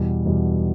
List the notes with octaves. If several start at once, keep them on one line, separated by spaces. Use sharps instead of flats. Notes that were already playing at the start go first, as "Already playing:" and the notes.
Already playing: E2 B2 G3
E2 B2 G3